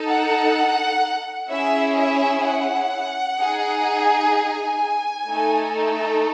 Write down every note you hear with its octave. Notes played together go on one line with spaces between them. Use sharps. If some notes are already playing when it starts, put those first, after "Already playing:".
Already playing: D#4 A4
F#5
C#4 E4 G#4 E5
E5
F#5
D#4 G#4
G#5
A3 D#4 A4